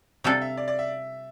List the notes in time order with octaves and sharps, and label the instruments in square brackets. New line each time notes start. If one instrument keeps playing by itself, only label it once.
[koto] C3 G3 D4 A4 [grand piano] F5
[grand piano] E5
D5
D5
E5